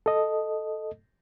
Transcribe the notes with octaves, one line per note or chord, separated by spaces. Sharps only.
A4 D#5